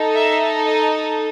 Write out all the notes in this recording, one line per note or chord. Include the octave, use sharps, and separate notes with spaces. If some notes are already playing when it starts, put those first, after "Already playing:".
Already playing: D#4 A4
E5
D#5